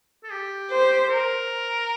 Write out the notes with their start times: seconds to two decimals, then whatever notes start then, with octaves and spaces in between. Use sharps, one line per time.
0.24 A4
0.31 G4
0.71 C5
1.09 A#4